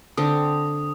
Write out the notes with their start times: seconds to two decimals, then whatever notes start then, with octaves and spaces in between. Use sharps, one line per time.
0.17 D3 C4 D#6